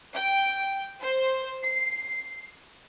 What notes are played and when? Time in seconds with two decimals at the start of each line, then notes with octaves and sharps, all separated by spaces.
0.15 G5
1.02 C5
1.64 C7